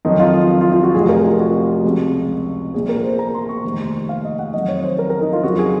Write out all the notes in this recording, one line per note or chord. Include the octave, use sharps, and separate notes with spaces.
F2 D#3 F#3 D#4
F4
F4
F4
F4
F#4
F1 F2 C3 G#4
A#4
F4
F#4
C#2 C3 F3
A#1 A#2 F3 G#4
A#4
C5
A#5
C6
C#6
F1 D#2 D#3
F5
D#5
F#5
F2 D#3 F#3 D#5
C#5
C5
A#4
A#4
D#4
F4
F2 C#3 F#3 F#4
G#4